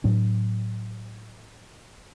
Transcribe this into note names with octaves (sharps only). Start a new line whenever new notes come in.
A2 F#3 D4